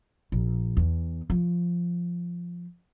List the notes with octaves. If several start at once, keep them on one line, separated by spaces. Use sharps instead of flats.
A#1
E2
F3